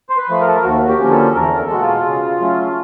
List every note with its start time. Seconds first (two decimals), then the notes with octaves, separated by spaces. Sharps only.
0.10 C5
0.17 B4
0.29 F3 A3
0.41 A#4
0.48 A4
0.55 A#4
0.64 D#2 F#4
0.88 G4
1.00 D3 F3 A#3 C#4
1.11 A4
1.35 E2 A#4
1.59 A4
1.70 B2 G#3 F#4
1.82 F4
2.05 C#3
2.40 F#3 A3 C#4